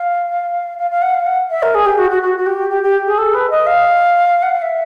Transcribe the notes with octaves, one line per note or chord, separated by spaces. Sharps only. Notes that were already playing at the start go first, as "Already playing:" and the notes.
Already playing: F5
F5
F5
F#5
F5
F#5
E5
A#4
G#4
G4
F#4
F#4
F#4
F#4
G4
G4
G4
G#4
A4
B4
D#5
F5
F#5
F5
E5